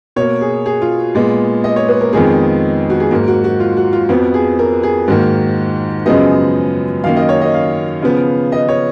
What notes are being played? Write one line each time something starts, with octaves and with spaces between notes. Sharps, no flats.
B2 A#3 C#5
G#4
G#4
F4
A#2 G#3 B3
D#5
C#5
B4
A#4
F2 D#3 G#3 B3 G#4
F#4
G#4
G#2 F#3 A#3 A#4
F#4
F#4
F4
F#4
F4
F2 F3 B3 F#4
G#4
A#4
G#4
G#2 D#3 A#3 F#4
F#2 C#3 F3 G#3 B3 D#5
F#2 D#3 A#3 F5
D#5
C#5
D#5
F5
C#3 F3 B3
D#5
C#5